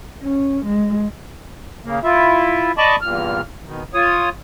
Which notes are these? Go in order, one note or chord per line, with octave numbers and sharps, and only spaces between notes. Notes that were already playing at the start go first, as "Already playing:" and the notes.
C#4
G#3
C#3 A#3
E4 F4 E5
D5 D#5 A5 B5 C#6 D6
E2 G2 A#2 F6
B2 D#3
F4 C#5 D#6